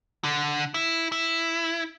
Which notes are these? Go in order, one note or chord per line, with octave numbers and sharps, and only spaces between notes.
D3
E4
E4